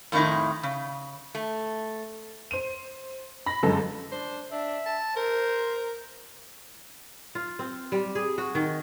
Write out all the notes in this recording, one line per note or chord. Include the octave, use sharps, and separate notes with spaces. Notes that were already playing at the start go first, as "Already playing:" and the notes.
F2 A2 D#3 G#3 D#4 E4
C#3
A3
C5 D#7
B5 A#6
G1 F#2 G#3 A4
D4 C5
D4 E5
A5
A#4 C5
F4
C4
G3
G#4
F#4
D#3